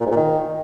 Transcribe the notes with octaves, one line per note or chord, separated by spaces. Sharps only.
A#2
G#2
A#2
D#3